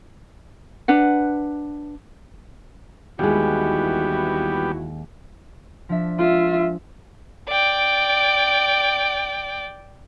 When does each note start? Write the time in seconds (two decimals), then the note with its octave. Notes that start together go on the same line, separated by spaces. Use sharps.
0.88 D4 B4 F#5
3.19 D#2 E3 G3 G#3 B3 E4 F#4 G4
5.89 F3 D4 E5
6.19 G#3 F4 E5
7.49 D5 G5